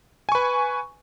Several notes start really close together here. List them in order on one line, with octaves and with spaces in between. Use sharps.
G#5 C#6 B4